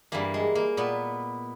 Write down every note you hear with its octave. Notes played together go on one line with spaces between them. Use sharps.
G2 E3 A#3
G#3
A#3
A#2 B3